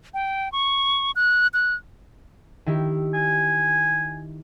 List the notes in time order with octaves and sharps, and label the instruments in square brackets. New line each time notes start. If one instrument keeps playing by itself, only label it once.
[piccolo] G5
C#6
F#6
F#6
[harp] D#3 E4 G4
[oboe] G#5